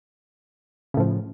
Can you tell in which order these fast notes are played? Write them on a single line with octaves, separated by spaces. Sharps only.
C#3 A2 F3